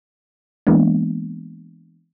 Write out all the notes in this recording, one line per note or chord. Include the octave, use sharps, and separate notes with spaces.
E3 G#3 A#3 B3 D4